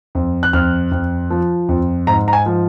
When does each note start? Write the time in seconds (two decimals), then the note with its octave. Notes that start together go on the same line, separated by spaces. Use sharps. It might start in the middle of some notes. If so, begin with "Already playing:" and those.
0.15 F2
0.43 F#6
0.53 F2 F6
0.91 F2
1.30 F3
1.69 F2
2.07 G#2 A#5
2.28 A#5
2.33 G#5
2.46 F3